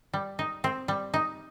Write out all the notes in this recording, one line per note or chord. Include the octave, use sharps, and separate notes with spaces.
G3
D#4
C4
G3
D#4